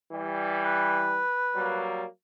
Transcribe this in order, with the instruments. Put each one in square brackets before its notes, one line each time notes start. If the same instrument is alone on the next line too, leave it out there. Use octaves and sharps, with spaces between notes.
[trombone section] E3 G3
[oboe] B4
[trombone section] F#3 G3 A#3